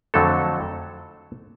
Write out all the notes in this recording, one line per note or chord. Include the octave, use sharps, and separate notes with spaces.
F2 D3 F#3 A3 A4